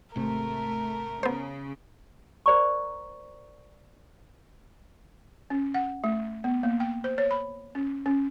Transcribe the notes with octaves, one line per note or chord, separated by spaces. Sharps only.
G#1 C3 A3 A#4
C#3 B3 C5
A#4 C5 D5 A#5 C#6
C#4
F#5
A3
B3
A#3
G5
C5
C#5
B5
C#4
C#4